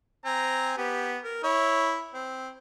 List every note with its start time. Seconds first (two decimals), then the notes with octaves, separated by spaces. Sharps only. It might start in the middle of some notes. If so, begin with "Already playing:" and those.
0.25 C4 G#5 A#5
0.77 B3 G4
1.24 A#4
1.44 E4 C#5
2.14 C4